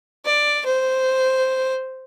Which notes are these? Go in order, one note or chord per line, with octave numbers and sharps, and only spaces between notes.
D5
C5